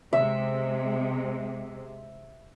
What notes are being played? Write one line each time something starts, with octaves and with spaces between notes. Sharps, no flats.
C3 G#3 E5